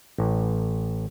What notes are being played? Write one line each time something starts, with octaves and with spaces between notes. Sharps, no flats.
A1